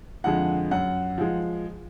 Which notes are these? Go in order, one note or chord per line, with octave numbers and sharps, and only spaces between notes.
F2 D3 F3 G#3 F#5
F#2 F#5
F3 G#3